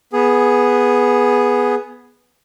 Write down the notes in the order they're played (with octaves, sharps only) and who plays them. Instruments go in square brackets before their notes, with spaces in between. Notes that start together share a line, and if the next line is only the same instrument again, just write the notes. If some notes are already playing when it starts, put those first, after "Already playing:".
[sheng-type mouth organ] B3 G#4